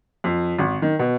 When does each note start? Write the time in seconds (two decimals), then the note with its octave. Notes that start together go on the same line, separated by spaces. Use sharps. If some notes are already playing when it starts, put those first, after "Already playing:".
0.24 F2
0.59 G#1
0.82 D#3
0.99 B2